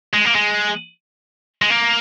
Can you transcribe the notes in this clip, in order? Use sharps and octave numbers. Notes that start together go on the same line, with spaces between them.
G#3
A#3
G#3
G#3
A#3